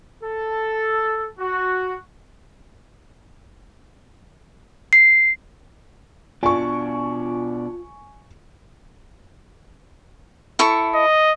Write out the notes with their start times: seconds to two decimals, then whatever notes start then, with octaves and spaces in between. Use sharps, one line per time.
0.23 A4
1.39 F#4
4.93 C7
6.43 B2 D4 F4 D5 G#5 C#6
10.59 E4 A4 C#6
10.94 D#5